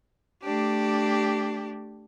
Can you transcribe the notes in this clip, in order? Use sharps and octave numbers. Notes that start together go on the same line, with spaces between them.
A3 D4 G4